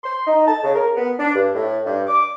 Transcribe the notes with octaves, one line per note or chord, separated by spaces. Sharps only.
C6
D#4
A5
C#3
A#4
B3
D4
G2
A2
G2
D6